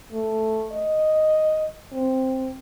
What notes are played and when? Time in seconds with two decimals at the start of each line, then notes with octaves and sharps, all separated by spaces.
0.12 A3
0.72 D#5
1.92 C4